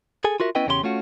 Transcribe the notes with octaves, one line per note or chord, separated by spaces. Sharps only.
G#4 A4 G#5
F4 F#4 A#4 E5
B3 C#4 E4 B4 D#5 G5
E2 C#3 C#4 G4 C5 C6
A3 C#4 F4 F#4